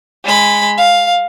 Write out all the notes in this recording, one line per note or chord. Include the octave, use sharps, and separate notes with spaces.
G#3 B5
F5